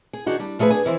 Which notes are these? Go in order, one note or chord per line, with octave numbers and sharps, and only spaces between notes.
G#4
D#3 D4 D#4 F#4 G#4
G3 D4
F3 A3 G#4 A4 B4
D4 G#4 G#5
D#3 E3 E4 C5